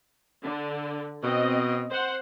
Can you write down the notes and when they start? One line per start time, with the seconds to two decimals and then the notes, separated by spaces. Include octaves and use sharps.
0.43 D3
1.23 B2 C4 D#5
1.91 C5 F#5